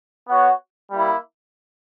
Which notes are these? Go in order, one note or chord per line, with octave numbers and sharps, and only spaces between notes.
B3 F#4 C#5 F#5
G3 A#3 E4